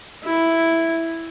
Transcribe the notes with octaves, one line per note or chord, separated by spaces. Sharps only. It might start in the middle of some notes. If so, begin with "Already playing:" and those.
E4